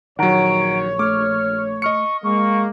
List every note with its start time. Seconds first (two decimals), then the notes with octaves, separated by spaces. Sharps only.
0.19 A#1 D#3 F#3 C#5 F#5 A#5 D7
0.99 A3 D6 F6
1.82 D#5 C#6 F6 C#7
2.24 G#3 A#3 C#6